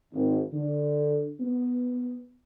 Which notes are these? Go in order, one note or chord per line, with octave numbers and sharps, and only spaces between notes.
G#1
D3
B3